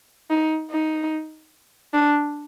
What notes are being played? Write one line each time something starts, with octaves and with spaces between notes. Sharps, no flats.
D#4
D#4
D4